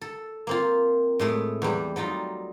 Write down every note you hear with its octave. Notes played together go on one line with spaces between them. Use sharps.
A4
A#3 C4 F4
A2 G#3 A3
E2 G3
F#3 G3 D#4 F4